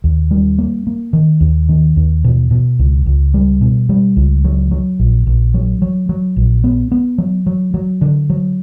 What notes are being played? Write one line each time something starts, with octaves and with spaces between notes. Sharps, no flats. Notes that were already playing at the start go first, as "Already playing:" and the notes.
D#2
G3
A#3
A#3
D#3
D#2
D#3
D#2
B2
B2
C#2
C#2
G3
B2
G3
C#2
F#3
F#3
A#1
A#1
F#3
F#3
F#3
A#1
B3
B3
F#3
F#3
F#3
D3
F#3